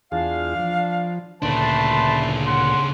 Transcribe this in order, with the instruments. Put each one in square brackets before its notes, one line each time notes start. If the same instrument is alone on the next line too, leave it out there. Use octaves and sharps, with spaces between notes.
[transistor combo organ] E2 F4 G#4 [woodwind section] D4 F5
[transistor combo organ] F3
[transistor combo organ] D2 A#2 [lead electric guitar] C#3 D4 [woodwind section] A3 C6 [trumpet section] B4 A5
[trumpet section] F#5 C6